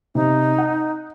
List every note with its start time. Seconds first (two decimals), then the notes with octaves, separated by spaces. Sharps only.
0.15 C3 D#4
0.58 F#5